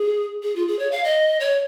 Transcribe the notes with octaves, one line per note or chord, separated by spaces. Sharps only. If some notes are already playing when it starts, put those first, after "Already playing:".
Already playing: G#4
G#4
F4
G#4
C#5
F5
D#5
C#5